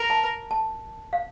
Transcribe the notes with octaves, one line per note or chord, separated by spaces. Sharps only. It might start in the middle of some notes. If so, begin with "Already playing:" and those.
Already playing: A#4
A5
A5
F5